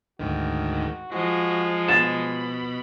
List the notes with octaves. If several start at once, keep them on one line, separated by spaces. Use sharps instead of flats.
D2 G#2 D#3 F#4
F3 G#3 F#4
B2 B5 A6 E7